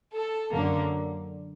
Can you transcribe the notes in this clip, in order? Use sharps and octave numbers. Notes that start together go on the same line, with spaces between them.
A4
F#2 D3 F#3 A#3